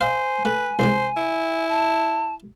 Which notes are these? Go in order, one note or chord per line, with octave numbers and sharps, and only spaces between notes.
C5 D#5 F5 G#5
A3 B4
C2 E3 G#3 C5
E4
A5